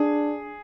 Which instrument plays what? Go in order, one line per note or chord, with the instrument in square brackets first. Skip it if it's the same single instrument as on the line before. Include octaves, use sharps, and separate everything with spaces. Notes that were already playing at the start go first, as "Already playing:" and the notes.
Already playing: [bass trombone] D4 [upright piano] G#4